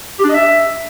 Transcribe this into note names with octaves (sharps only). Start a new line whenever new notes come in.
G4
D4
D#5
E5